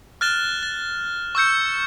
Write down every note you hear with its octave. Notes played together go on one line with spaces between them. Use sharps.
F6 F#6 A6 E7 G7
A6
C#6 E6 G6 C#7